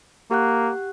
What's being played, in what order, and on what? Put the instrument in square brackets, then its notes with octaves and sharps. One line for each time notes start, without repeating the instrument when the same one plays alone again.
[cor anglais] A#3 [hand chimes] G4 F#5 F#6